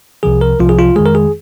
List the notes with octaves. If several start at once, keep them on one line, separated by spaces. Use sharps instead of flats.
C2 C3 F3 G#4
A#4
C2 C3 F3 F4
G#4
F4
F2 D#3 G#3 G#4
A#4
G#4